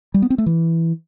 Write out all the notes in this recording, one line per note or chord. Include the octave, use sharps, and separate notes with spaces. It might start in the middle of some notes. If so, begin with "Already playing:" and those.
G3
B3
C4
A3
E3